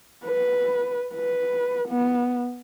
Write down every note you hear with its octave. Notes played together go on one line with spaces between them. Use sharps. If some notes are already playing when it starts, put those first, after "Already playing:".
B4
B4
B3